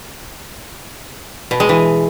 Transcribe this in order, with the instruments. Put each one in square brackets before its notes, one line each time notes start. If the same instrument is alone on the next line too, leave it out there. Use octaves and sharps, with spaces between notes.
[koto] B2
G#3
E3